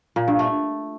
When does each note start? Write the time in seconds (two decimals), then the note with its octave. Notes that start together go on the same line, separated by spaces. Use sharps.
0.16 A#2
0.28 G2
0.39 A3